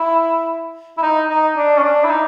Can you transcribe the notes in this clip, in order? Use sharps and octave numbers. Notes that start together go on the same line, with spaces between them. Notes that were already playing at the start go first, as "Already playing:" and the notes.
Already playing: E4
E4
D#4
D#4
D4
C#4
D4
E4
D#4